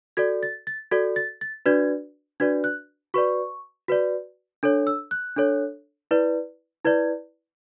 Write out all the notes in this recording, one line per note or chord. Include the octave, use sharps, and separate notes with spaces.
F#4 A4 D5 G#6
A6
A6
F#4 A4 D5 G#6
A6
A6
D4 F#4 B4 D5 G#6
D4 F#4 B4 D5 G#6
F#6
F#4 B4 D5 C#6
F#4 B4 D5
D4 A4 C#5
E6
F#6
D4 A4 C#5
E4 B4 D5
E4 B4 D5 G#6